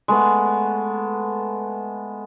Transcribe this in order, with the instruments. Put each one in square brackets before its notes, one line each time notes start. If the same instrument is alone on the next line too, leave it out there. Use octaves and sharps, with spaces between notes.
[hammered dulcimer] G#3 A3 B3 F#5